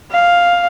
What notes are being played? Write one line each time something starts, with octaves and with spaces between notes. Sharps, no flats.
F5